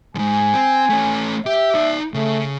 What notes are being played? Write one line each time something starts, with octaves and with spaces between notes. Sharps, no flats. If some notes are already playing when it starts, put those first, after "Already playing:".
F2 G#2 G#5
C4
A3 C#4
G4 E5 G5
D#4 D5
C#3 A3